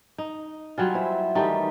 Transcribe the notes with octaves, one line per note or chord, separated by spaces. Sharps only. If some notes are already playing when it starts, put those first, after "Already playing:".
D#4
F#3 G3 F4 G#5
E4 C5
D#3 E3 G3 A3 G4